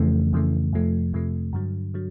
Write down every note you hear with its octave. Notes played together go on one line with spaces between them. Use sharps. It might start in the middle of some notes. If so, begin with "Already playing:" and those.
Already playing: F2 C#3 E3 A3
F2 C#3 E3 A3
F2 C3 F3 A3
F2 C3 F3 A3
G2 D3 F#3
D3 F#3